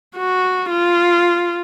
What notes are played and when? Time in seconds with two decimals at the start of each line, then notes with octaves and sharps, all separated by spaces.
0.16 F#4
0.70 F4